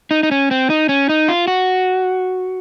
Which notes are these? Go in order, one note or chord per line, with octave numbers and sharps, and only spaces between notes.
D#4
D#4
C#4
C4
D#4
C#4
D#4
F4
F#4